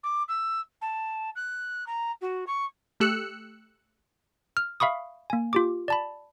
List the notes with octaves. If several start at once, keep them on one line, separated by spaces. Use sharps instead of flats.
D6
E6
A5
F#6
A#5
F#4
C#6
A3 G4 E6 F#6 C#7
F6
E5 F5 B5 C#6 D#6
A#3 G#5
F4 G4 D6
D5 A5 B5